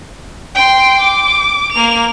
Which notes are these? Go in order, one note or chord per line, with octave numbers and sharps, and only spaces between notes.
G5 C6
D6
A#3 F7